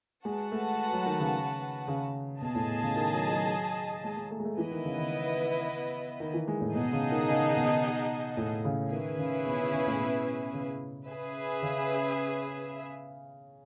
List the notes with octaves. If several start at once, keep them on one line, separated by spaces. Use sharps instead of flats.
G#3 F#4 B4 F#5 A5
A3
F#3
D#3
C#3
C#3
B2 G#4 D#5 A5
A2
B2
C#3
D#3
F#3
F#3
G#3
G#3
A3
G#3
A3
E3 B3 E4 B4 D#5
D#3
C#3
C#3
D#3
E3
G#3
A2
B2 D#4 G#4 D#5 F#5 A5
C#3
D#3
C#3
B2
A2
C#3
D#3 C#4 E4 G#4 B4
C#3
B2
C#3
C#3
A2
B2
C#3
C#4 G#4 B4 E5
C#3